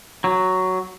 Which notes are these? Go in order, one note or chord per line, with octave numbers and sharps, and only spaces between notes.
F#3